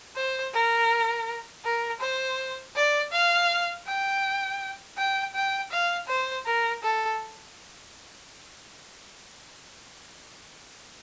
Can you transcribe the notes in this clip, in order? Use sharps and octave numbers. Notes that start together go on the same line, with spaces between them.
C5
A#4
A#4
C5
D5
F5
G5
G5
G5
F5
C5
A#4
A4